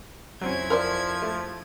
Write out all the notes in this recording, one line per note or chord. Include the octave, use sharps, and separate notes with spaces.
F2 F#3 C4 C#4 E4 G#6
F3 A#4 C5 D5
A3